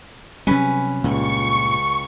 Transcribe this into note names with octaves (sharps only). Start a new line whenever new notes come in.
C3 F#3 G3 C#4 B4
C#2 G2 A#2 C#6